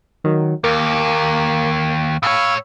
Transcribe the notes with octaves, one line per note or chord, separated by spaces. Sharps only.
D#3 F#3
D#2 A#3 A#4
A2 C#5 F5 B5 E6